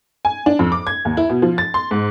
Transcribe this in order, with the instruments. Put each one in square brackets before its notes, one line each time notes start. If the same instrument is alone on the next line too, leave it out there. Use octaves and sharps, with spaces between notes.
[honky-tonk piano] G#5
D4
F2
D6
G#6
D#2
E4
B2
F3
A6
C6
G#2